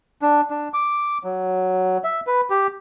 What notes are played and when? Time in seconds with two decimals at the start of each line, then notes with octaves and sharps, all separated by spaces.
0.22 D4
0.50 D4
0.74 D6
1.24 F#3
2.04 E5
2.27 B4
2.50 G4